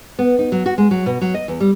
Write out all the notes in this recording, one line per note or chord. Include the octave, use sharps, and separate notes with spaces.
B3
D#4
F#3
F#4
G#3
F#3
B2
F#3
D#5
E2
G3